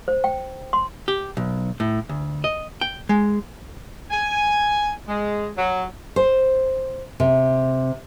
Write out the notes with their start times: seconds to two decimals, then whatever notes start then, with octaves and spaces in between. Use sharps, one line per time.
0.08 C5
0.24 G5
0.73 C6
1.08 G4
1.37 B1
1.80 A2
2.09 D2
2.44 D#5
2.81 G5
3.09 G#3
4.11 G#5
5.08 G#3
5.57 F#3
6.16 C5
7.20 C3